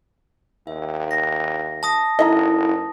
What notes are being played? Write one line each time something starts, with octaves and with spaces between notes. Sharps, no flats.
D#2 E5
A#6
A5 D#6 A#6
F#1 D#4 E4 A4 D#5 E5 A#5